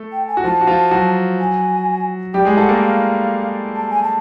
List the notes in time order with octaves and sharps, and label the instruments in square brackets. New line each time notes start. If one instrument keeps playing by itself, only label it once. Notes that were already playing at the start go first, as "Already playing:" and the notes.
Already playing: [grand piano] A3 A4
[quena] G5
G#5
[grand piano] F#4
[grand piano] F3 F4 [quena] A5
[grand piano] F#4
F3 F4
F#3 F#4
[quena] G#5
[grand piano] G3 G4 [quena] G5
[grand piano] G#3 G#4
[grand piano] A3 A4 [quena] F#5
[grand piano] A#3 A#4
[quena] F5
A5
G#5
A5